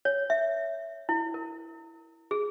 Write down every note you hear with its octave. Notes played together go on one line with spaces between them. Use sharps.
C#5
E5
E4
A#4
G#4